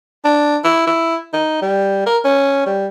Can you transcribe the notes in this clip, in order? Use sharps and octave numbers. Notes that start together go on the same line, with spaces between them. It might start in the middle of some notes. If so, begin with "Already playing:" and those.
D4
E4
E4
D#4
G3
A#4
C#4
G3